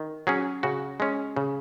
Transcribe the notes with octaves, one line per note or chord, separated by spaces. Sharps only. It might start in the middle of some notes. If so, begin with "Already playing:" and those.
Already playing: D#3
F#3 C#4 G#4
C#3 F#4
G#3 C#4
C#3